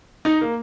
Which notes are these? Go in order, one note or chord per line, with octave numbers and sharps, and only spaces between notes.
D#4
A#3